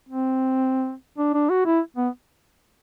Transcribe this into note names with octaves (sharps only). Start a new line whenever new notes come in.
C4
D4
D4
F#4
E4
B3